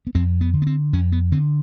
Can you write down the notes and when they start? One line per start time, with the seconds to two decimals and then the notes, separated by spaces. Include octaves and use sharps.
0.07 B3
0.15 F2 C4
0.41 B3
0.53 D3
0.62 B3
0.67 C4
0.93 F2 C#4
1.12 B3
1.32 D3 C4